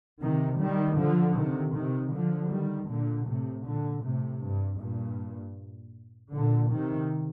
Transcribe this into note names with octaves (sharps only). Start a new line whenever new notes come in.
C3 D#3
D#3 G3
D3 F3
C3 D#3
C3 D#3
D3 F3
D#3 G3
A#2 D3
A2 C3
A#2 D3
A2 C3
G2
G2 A#2
A#2 D3
C3 D#3